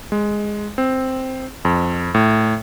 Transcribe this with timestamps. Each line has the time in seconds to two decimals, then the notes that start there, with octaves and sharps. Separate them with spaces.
0.12 G#3
0.78 C4
1.65 F2
2.14 A2